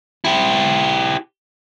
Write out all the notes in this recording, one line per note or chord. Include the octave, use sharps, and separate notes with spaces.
E4 G4